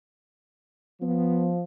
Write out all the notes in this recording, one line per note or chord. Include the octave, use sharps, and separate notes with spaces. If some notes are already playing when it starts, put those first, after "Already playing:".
F3 B3